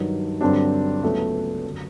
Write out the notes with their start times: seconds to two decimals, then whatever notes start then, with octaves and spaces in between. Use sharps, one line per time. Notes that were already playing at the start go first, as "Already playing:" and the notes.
Already playing: G2 D#3 F#3
0.41 G2 D3 F#3 C4 D4
1.02 C#2 C#3 F#3 A3 B3
1.64 F#2 D3 F#3